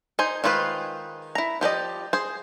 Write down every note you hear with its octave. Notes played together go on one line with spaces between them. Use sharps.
D#4 C5 G#5
D#3 G#3 F4 B4 C5
E4 A#5
F3 G4 D5 D#5
G#4 C5